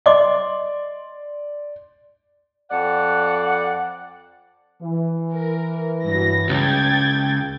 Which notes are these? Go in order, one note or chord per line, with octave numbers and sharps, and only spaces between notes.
D5 D#5 C6 D6
F2 D5 F#5
E3
A#4
G2 F#3 A#6
C#2 G5 G#6 A6